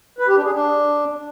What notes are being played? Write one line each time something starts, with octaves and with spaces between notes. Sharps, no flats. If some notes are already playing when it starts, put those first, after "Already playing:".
B4
G4
D4
G#4
D4